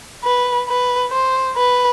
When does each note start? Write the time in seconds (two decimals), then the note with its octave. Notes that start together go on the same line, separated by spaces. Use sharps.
0.24 B4
0.68 B4
1.12 C5
1.57 B4